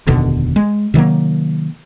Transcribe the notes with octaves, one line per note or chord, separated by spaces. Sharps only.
F1 D#2 B2 D3
G#3
C3 D#3 F#3 A#3